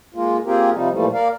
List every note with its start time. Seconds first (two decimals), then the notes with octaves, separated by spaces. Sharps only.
0.14 G#3 A#3 F4
0.45 A#3 C4 F4 G4 G#4 A#4
0.73 C3 F3 G3 D#4
0.91 A#2 E3 F3 G3 A3
1.13 A#3 A#4 D5 F5